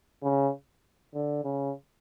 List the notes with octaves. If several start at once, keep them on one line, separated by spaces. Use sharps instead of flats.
C#3
D3
C#3